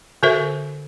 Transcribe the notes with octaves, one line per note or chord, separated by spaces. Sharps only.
D3 F#4 A#4 C5 E5